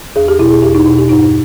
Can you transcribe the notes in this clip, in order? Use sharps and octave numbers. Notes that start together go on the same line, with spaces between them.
E2 G#4
G4
B2 E4
G#4
E2 G4
D#4
B2
G4
G2 D#4